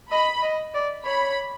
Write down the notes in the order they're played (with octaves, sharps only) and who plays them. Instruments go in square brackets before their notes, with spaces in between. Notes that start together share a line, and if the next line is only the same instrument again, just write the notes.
[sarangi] D#5 [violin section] B5
[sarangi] D#5
D5
[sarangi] C#5 [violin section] B5